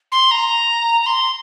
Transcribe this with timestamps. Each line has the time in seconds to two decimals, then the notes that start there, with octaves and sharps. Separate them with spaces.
0.12 C6
0.31 A#5
1.01 A#5
1.06 C6